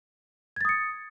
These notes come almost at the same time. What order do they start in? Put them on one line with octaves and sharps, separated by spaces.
G#6 A6 D#6 C#7